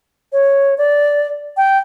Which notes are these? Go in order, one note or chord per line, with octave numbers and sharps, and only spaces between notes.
C#5
D5
G5